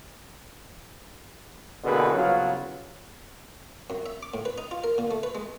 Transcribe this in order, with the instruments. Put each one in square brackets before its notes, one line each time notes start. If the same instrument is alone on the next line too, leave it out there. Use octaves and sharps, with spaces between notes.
[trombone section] A1 B2 D3 A#3 G#4 B4
C2 C#3 F#3 B3 F4 F#4
[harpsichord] F#2
E5
D6
A2
B4
D#4
F4
A#4
A#2
A3
B4
G#3